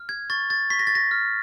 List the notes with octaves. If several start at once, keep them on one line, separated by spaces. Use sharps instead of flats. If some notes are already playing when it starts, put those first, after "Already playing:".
Already playing: F6
G#6
C#6 A6
A6
C#6 B6
A#6
A6
A#6
F6